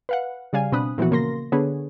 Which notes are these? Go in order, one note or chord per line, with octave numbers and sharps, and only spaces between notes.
B4 F5 F#5
C#3 G3 D5 F5 G#5
B2 C4 D4 B5 D#6 F#6
A#2 E3 F3 B3 F#4
C#3 A#3 A#4 C6 A#6
D3 B3 D4 G#4 B4 C#5